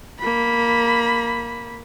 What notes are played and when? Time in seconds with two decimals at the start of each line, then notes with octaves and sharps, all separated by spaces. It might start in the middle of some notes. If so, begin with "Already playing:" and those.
0.20 A#3 B5